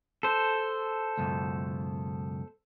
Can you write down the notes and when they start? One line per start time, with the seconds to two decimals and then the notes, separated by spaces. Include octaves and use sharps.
0.23 A4 C5
1.17 C#2 F#2 B2